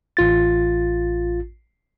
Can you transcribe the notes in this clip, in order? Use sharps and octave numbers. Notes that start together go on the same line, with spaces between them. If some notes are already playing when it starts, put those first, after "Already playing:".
A1 F4 A6